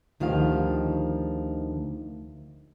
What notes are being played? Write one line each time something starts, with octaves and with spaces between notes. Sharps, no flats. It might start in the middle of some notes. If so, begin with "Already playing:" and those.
D2 D#3 F3 G4 F5